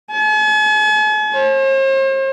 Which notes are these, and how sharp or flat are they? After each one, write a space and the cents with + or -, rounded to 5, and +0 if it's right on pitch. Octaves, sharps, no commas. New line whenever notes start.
G#5 +45
C5 +45